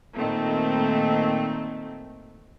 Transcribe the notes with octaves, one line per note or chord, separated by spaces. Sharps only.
A#2 D#3 A3 C4